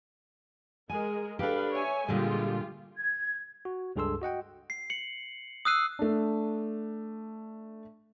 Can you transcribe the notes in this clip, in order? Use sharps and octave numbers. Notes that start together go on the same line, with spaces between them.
G#3 G#4 A#4 G#5
D4 G4 A4 B4 F5
C#5 E5 G#5
A#2 D3 G3 G#3 F4 G4
G#6
F#4
C#2 G2 G#4 A4 C6 E6
F#4 D#5 F#5 G5
C7
C#7 F#7
D#6 E6 F#6 C7 D#7
A3 D4